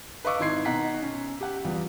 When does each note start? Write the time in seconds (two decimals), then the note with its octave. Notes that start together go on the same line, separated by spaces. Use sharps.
0.25 B4 D#5 F5 C#6 D6 E6
0.39 G#1 D#4 E4 C6 G#6 C7
0.65 B2 D#4 F#5 A#5 B6
1.02 C#4
1.41 G4 F#5
1.64 E2 G3 F4